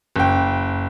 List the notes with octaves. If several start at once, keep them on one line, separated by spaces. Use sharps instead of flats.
F#1 G5